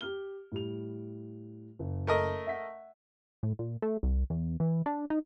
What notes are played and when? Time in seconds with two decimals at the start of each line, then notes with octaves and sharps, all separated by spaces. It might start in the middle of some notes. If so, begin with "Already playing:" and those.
0.01 G4 F6 G7
0.52 A2 G3 F7
1.79 F#1
2.07 A3 A#4 D#5
2.47 E5 F#5 B6
3.43 A2
3.59 A#2
3.82 A3
4.03 C2
4.30 E2
4.60 E3
4.86 D4
5.10 D#4